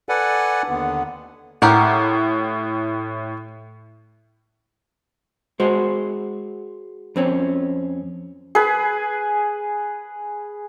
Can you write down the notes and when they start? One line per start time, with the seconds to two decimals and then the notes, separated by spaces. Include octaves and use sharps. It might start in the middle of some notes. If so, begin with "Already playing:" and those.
0.09 A4 B4 D5 F#5 G#5
0.69 D#2 D3 B3
1.62 A2 G4 A#4 F#5
5.60 G#3 F#4 C5
7.16 F2 C4 C#4
8.55 G#4 B4